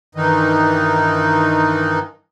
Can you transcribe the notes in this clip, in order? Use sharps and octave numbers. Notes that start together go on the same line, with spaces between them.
G2 D#3 E3 D#4